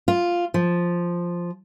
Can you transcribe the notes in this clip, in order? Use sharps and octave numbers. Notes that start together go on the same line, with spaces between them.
F4
F3